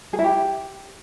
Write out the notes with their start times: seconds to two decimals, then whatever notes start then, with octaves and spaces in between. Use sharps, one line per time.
0.13 G#4
0.19 E4
0.24 G4